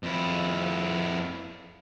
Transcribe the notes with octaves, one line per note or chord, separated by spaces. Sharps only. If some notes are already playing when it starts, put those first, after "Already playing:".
F2 E4